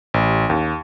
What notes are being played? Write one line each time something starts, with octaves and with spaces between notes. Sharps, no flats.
A1
D#2